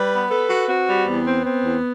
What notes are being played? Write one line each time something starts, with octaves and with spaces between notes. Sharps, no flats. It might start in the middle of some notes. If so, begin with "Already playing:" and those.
Already playing: G3 B4
B3
A4 B4
F#4
C4 F#4
G3
E2 B3
C4
C4
E2